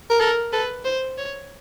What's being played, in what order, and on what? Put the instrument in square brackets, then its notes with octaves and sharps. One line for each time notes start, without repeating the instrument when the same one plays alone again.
[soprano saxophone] A#4
[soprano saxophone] A4 [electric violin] A#4
[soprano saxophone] A4 [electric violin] B4
[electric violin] C5
C#5